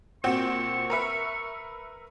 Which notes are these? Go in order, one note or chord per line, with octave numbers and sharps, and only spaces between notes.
A#2 C4 F#4 C#6
A#4 B4 E5